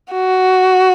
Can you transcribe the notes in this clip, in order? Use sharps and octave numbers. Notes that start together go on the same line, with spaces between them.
F#4